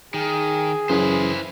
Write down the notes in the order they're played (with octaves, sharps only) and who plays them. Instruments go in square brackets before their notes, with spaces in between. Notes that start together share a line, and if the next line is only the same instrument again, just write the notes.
[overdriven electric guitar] D#3 [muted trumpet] G#4
[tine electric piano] F#2 C#3 E3 [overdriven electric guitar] E4 C5